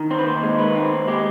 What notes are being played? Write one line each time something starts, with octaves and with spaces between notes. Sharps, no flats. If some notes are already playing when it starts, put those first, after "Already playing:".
Already playing: D#3
C4 C5
B4
D#2 C5
G#3
D#3 B4
C4
D#2
G#3 G4